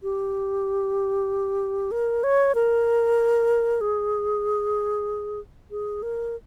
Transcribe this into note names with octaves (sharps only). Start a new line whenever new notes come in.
G4
A#4
C#5
A#4
G#4
G#4
A#4